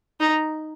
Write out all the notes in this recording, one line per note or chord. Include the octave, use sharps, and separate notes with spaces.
D#4